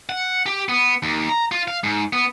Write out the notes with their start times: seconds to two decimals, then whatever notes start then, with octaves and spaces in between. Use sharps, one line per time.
0.09 F#5
0.46 G4
0.69 B3
1.03 D#2
1.29 A#5
1.51 F4
1.68 F5
1.83 G#2
2.13 B3